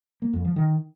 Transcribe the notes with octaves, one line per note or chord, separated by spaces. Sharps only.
A#3
F2
F3
D#3